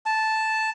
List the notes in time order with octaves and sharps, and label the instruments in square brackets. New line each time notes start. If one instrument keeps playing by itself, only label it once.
[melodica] A5